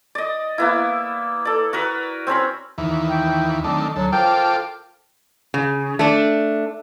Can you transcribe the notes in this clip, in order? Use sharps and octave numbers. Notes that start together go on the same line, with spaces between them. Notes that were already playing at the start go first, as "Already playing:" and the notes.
D5 D#5
A#3 B3 E4
A4 D5
F#4 A#4 B4
C4 C#4 A#4 B5
D#2 E3
G5
D#3 F#3 A3 C4 D4
D2 F#3 A4
F4 A4 A#4 C5 G5 D6
C#3
A3 D4